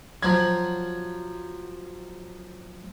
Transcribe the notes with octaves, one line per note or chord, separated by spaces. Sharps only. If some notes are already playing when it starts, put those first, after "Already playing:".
F3 F#3 G#6